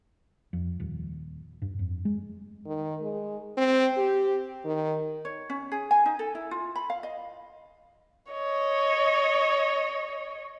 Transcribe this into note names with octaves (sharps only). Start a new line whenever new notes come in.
F2
D#1
G2
F2
G#3
D#3
G#3
C4
G4
D#3
C#5
C#4
G#4
G#5
D#4
A4
E4
F4
B5
F5
D#5
C#5 D#5